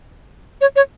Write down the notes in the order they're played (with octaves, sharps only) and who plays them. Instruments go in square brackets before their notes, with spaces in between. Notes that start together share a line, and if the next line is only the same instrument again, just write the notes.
[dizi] C#5
C#5